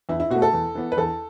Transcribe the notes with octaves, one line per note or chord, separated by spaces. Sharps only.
E2 E4
E4
B2 A3 F#4
A4
E2
E3 B3
B4
E2 A4